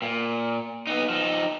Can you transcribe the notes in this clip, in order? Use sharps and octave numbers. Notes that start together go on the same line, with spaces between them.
A#2
B3 D#4
F3 D#4